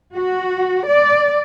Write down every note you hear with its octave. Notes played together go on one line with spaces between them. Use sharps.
F#4
D5